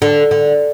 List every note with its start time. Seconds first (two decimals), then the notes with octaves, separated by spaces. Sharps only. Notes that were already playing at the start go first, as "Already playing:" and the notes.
0.02 D3
0.31 D3